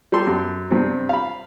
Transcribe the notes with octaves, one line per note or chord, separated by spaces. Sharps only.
G3 G4 A4 C6
F#2
G2 C3 C4
F5 B5